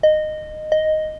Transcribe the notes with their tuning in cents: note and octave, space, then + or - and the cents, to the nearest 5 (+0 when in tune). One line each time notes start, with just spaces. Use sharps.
D#5 -15
D#5 +0